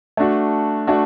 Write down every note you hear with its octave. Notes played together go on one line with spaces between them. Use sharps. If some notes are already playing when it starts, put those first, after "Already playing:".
A3 D4 F#4
A3 D4 F#4